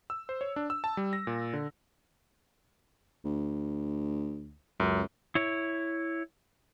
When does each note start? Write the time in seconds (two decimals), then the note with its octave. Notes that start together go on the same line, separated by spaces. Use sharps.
0.10 E6
0.29 C5
0.41 C#5
0.56 D4
0.70 E6
0.84 A5
0.97 G3
1.13 A#6
1.27 A#2
1.53 D3
3.25 D2
4.80 C#2 F#2
5.35 E4 C#5